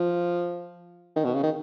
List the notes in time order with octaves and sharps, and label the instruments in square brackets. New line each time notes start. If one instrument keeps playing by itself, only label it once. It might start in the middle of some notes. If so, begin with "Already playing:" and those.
Already playing: [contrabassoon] F3
D#3
B2
C#3
D#3